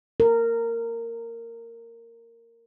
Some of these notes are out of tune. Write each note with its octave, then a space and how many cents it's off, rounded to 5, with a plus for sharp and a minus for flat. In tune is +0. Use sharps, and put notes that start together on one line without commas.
A#4 -15